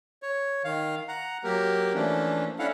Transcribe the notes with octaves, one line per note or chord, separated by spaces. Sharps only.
C#5
D#3 F5
F#5 A#5
F#3 A#3 G4 A#4
E3 F3 A3 A#3 C#4 D4
C#4 D4 E4 A4 F5 F#5